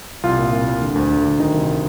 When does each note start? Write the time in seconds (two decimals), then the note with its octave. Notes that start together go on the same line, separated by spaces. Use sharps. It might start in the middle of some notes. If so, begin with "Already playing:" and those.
0.24 C2 F4
0.39 A#2
0.53 C2
0.67 A#2
0.82 D3
0.95 D2
1.11 D3
1.25 D2
1.39 D#3 D#4
1.54 C2